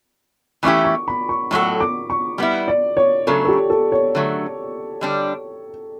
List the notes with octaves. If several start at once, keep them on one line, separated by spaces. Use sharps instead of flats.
E3 A3 C#4 E4 G4 D6
C#6
B5
C#6
A2 F#3 B3 F#4 A4 C#6
D6
C#6
G3 B3 E4
D5
C#5
C#3 F#3 A3 D4 A4
A4
G4
A4
C#5
D3 F#3 A3
D3 G3 D4